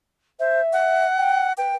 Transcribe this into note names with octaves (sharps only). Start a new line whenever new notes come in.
C5 E5
F#5
G5
B4 G5